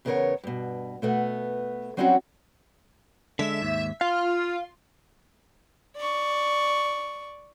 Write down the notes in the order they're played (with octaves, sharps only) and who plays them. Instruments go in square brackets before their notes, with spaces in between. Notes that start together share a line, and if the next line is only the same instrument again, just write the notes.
[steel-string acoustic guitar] E2 C#3 B3 F#4 A#4 C#5
G2 B2
B2 A3 B3
F#3 G3 C4 C#4 E4 F#4
[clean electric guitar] D3 G#3 [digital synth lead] E5
[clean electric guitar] D#2 G#2
[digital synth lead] F4 [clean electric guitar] F5
[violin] D5 C#6